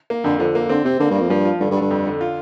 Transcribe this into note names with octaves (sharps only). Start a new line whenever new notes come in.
A#3
F2 D3
D3 F3
A#3
D3 C4
C3 C4
D3 A#3
G2
A#3
F2
G2 F3
F4
G2 D3
G2
D3
G2
F2
D3
F4